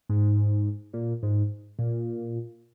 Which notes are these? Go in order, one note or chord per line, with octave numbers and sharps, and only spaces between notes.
G#2
A#2
G#2
A#2